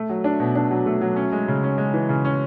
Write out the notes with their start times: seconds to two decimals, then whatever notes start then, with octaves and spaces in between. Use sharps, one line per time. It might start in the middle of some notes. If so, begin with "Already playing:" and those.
Already playing: A3
0.09 F#3
0.24 D4
0.40 B2
0.55 D4
0.71 F#3
0.86 A3
1.01 F#3
1.16 C#4
1.32 G#3
1.48 C#3
1.64 C#4
1.78 G#3
1.94 E3
2.09 C#3
2.25 C#4